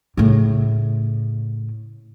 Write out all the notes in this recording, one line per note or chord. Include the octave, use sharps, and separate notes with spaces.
A2 C#3